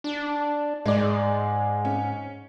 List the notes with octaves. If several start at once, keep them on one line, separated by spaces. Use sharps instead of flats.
D4
G#2 G#3 D5
C#4